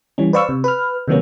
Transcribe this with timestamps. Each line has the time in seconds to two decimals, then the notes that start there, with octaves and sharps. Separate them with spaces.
0.18 E3 G3 C#4
0.33 B4 C5 D5 F5 C#6 E6
0.49 C3
0.64 B4 F6
1.08 C3 D#3 F#3 A#3 B3 C#4